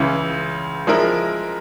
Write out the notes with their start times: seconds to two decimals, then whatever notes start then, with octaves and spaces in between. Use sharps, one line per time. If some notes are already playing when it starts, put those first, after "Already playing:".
Already playing: C#2 C#3 E3
0.87 F3 G#3 E4 A#4